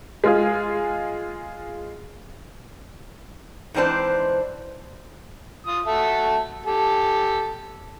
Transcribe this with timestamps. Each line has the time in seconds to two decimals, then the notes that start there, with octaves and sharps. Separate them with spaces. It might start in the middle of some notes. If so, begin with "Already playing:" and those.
0.24 G#3 F4 G#4
3.74 G#2 E3 C4 D4 C5
5.67 F4 D#6
5.86 F#4 A4 E5
6.66 G4 A4